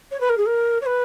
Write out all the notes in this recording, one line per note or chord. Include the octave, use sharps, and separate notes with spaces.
C#5
B4
A#4
G#4
A#4
C#5
B4